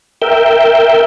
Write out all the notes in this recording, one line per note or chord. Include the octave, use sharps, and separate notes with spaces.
A#4 E5 G5